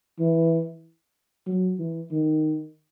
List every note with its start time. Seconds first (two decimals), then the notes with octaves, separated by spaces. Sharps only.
0.19 E3
1.47 F#3
1.79 E3
2.11 D#3